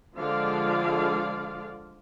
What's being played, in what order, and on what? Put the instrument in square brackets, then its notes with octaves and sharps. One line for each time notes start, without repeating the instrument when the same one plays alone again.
[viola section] D3 F3 G#3 F4 D5 F5